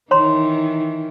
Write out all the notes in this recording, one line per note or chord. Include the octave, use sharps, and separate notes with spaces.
D#3 E3 C#5 A#5 C6